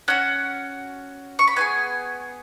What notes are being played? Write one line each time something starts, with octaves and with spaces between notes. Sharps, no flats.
C#4 F#4 F#5
C#6
B5
B3 D#4 G#4 G#5